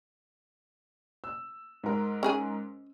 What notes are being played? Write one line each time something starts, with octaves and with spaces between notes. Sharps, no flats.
E6
G#2 A#4
C#4 G#4 G#5